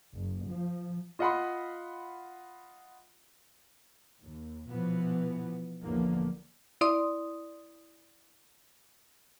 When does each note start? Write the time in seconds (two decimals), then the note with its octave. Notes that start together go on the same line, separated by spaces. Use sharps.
0.11 F#1
0.48 F3
1.19 F4 D#5 F5 F#5 B5 C6
4.23 D#2
4.69 B2 E3 F3 B3
5.83 B1 E2 A2 D3 F3 A#3
6.81 E4 D5 C6 D#6